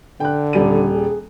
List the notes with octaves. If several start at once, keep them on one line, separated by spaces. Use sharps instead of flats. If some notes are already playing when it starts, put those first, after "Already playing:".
D3 G5 F#6
D#1 G3 D#7
G#4